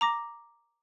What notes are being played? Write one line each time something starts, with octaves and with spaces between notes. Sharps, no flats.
A#5 D6 A#6